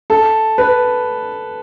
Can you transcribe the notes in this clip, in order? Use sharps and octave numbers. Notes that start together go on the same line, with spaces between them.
A4
B4